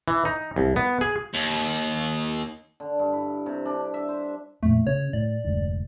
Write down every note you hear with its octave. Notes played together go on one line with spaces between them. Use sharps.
E3
D#4
C2
B3
G#4
D#2
D3
G2
E4
C3
D4
E5
C5
F2 A#2 A3
C#3 C#5
A2 D5
F1 D2 G#2